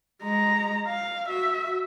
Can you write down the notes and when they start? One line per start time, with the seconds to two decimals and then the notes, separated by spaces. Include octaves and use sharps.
0.22 G#3 A#5
0.88 F5
1.28 F#4 E5